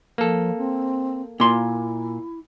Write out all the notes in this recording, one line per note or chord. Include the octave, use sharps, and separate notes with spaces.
F3 A#3 A4
C4
A#2 E4 C6